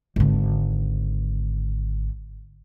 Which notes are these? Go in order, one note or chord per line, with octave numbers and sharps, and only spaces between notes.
G#1 D3